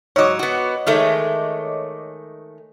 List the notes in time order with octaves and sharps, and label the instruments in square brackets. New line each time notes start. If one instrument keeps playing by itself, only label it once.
[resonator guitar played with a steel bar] G#2 F#3 [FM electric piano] C#5 D#5 D6
[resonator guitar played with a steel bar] B3 F#4
D#3 G#3 A3